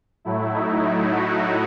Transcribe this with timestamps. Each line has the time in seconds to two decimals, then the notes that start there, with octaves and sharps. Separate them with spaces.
0.25 A2 F#3 A3 E4
0.53 D#4
1.10 F#4